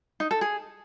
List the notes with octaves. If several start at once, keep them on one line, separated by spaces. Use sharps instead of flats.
D#4
A4
G#4